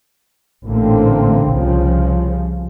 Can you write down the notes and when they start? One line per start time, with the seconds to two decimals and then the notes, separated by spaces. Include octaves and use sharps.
0.65 A1 A#2 D3 A3 A#3 C4
1.49 C2 C#3 F3